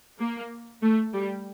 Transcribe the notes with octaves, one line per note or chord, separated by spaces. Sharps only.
A#3
A3
G3